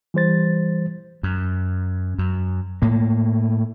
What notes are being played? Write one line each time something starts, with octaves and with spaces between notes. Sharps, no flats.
E3 G3 C5 A6
F#2
F#2
A2 A#3